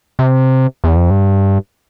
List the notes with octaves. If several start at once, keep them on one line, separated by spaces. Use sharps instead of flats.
C3
E2
F2
G2